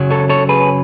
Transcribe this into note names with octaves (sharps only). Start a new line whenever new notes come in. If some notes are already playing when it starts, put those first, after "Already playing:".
Already playing: F#2 C#3 F#3
A4 C#5
A4 C#5
G#4 B4